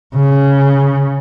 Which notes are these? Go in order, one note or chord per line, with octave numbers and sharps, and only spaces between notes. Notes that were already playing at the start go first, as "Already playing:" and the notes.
C#3